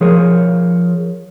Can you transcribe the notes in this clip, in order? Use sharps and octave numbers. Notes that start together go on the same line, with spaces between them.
F3 G#4 A#4 C#5